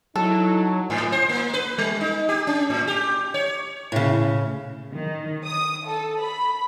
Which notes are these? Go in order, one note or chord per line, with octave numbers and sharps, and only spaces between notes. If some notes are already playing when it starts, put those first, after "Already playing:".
F#3 D#4 E4 A4
G#2
C5
A#3
B4
G3
D#4
G4
C#4
A2
G4
C#5
A2 C#3
D#3
D#6
A4
B5